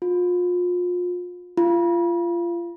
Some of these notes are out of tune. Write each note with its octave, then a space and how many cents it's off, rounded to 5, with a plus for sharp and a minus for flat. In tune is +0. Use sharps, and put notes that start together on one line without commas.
F4 +35
F4 -25